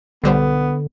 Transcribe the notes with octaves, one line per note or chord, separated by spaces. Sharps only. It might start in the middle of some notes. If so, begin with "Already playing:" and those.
B1 D3 G3 B3 C5